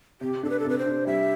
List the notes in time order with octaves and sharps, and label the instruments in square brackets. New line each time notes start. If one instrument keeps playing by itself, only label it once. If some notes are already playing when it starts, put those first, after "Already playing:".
[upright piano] C3 [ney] G4
[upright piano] D4 [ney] A4
[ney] B4
A4
[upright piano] C3 [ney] B4
[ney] C5
[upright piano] D4
[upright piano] G3 [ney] E5